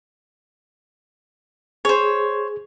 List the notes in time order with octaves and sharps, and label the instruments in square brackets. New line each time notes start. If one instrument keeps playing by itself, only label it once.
[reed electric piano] G#4 [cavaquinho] C5 C#5